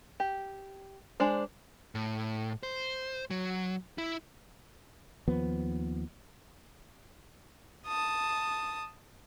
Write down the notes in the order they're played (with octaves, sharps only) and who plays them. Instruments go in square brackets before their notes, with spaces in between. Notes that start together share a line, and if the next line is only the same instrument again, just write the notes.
[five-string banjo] G4
G#3 D4 C5
[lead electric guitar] A2
C5
F#3
E4
[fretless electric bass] D#2 F3 B3
[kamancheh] A5 D#6